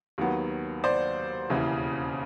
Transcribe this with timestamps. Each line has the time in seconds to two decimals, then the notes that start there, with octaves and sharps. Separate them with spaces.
0.18 D#2 D#3 F#3 B3
0.84 C5 D5
1.50 E1 D#2 C#3 E3